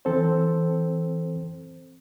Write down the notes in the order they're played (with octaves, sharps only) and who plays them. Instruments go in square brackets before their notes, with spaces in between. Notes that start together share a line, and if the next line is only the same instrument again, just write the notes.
[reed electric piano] E3 C4 A4 C5